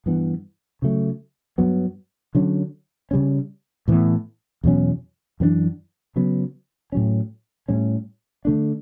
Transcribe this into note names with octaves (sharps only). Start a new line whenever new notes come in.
G2 E3 B3
C#3 F#3 A3
G2 F#3 B3
D3 F#3 C#4
C#3 G3 C#4
A2 E3 B3
E2 B2 F#3 C#4
F#2 E3 B3 D4
C#3 F#3 B3
A2 F#3 C#4
A2 G3 C#4
D3 A3 D4